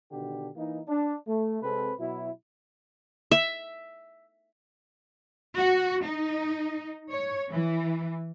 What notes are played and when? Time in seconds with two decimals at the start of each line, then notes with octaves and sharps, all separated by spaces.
0.11 B2 D3 D#3 D4 G4
0.56 E3 A#3 D#4
0.87 D4
1.26 A3
1.61 C3 G#3 C4 A4 B4
1.98 B2 F#3 E4
3.31 E5
5.56 F#4
6.05 D#4
7.11 C#5
7.51 E3